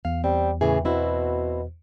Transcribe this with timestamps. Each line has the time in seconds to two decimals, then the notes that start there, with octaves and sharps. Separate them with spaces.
0.05 E2 F5
0.24 G3 C4
0.61 A2 C#3 E3 G#4
0.85 B2 C4 E4 F#4